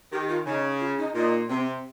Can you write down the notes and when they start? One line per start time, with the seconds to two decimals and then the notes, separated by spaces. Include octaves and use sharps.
0.12 D#3 G4
0.28 F4
0.46 C#3 D#4
0.80 F4
0.98 D#4
1.15 A#2 D#4
1.49 C3 C4